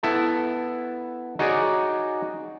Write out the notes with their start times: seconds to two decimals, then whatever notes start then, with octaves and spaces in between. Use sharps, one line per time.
0.03 B3 E4 A4 A5
1.39 D#4 F#4 G#4 C#5 D5